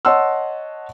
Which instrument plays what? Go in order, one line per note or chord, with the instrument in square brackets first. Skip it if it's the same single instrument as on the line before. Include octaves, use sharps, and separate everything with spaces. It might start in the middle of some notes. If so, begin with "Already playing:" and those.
[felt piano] C#5 D#5 F#5 A5 C6 E6